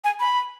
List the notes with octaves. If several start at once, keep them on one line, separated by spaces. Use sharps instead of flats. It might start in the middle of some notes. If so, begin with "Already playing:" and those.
G#5
B5